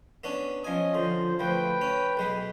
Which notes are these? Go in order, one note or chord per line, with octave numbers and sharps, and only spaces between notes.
B3 C#4 D4
F3 C#4 D#5 G#5
D3 F3 C5
D2 F3 B4 G5
C#4
B1 G#3 B4